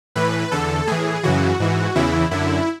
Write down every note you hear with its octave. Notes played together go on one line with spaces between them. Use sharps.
A2 E3 B4
E2 D3 A4
A2 E3 G#4
F#2 C#3 E3 F#4
G#2 E3
E2 C#3 E3 E4
F#2 D3 E4